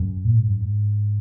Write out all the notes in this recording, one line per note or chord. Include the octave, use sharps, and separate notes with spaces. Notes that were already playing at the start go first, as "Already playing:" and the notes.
Already playing: F#2
A#2
G#2
F#2
G#2